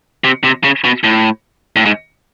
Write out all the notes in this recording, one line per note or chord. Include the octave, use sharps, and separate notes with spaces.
C3
C3
C#3
B2
A2
A2
G#2